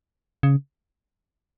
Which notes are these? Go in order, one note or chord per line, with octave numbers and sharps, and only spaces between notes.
C#3